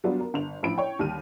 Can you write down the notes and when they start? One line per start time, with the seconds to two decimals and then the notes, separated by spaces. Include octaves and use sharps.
0.04 F#3 G3 B3 D4 F4 F#4
0.20 A#4
0.34 G1 F7
0.63 A1 F3 B5 D7
0.78 C#5 G5
0.99 D#2 D3 G3 F6 D#7